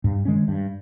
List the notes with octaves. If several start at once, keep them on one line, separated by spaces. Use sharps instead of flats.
G2
D#3 G#3 C#4
G2